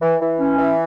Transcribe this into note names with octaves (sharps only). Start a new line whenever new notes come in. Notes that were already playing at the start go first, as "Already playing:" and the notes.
E3
E3
C#4
E3